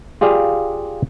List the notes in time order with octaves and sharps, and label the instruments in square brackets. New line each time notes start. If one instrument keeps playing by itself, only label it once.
[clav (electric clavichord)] F4 G4 G#4 D5 F5